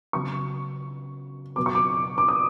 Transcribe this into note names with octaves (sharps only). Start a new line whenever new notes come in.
C#3 F#3 B3 C#6
B2 F#3 B3 D6
C#6
D6
D6
D#6